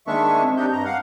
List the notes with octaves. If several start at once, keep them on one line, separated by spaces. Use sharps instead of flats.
D#3 G#3 A#3 D4 E5 C#6
G#5
C4
D4 D#4 G4 G6
G2 A#5
F5 F#5